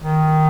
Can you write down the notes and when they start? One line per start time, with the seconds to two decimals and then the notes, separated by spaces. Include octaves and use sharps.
0.01 D#3